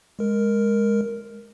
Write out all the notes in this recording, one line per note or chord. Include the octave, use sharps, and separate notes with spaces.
G#3 A#4